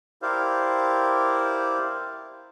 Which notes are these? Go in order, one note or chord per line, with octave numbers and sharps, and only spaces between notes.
E4 G4 A#4 C5 D5 F5